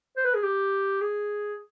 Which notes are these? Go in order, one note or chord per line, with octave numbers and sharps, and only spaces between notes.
C5
B4
G#4
G4
G#4